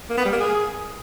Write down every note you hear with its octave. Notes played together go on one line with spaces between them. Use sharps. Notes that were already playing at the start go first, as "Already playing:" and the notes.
A#3
B3
G3
A#3
G#4